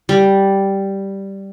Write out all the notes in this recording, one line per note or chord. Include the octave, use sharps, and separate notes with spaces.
G3